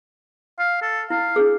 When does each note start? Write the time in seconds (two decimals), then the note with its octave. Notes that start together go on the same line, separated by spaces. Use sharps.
0.59 F5
0.82 A4
1.10 E4 F5
1.36 D4 G#4